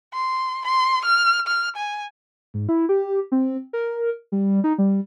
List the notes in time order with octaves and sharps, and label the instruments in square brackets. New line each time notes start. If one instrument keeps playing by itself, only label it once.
[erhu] C6
C6
F6
F6
G#5
[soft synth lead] G#2
E4
G4
C4
A#4
G3
D#4
G3